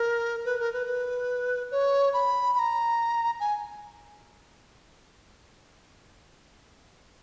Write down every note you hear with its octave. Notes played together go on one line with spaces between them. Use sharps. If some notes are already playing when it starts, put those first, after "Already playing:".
Already playing: A#4
B4
A#4
B4
B4
C#5
B5
B5
A#5
G#5